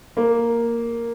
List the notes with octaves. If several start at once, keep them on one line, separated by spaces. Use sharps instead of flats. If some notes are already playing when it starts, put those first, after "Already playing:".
A#3